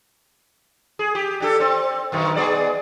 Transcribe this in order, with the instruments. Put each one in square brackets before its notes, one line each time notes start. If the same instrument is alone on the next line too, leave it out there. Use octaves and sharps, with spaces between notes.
[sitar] G#4
G4
D4 G4 A4
C4
F#2 B2 D#3
B3 G#4 D5